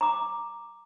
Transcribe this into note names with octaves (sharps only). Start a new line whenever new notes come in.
A#5 D6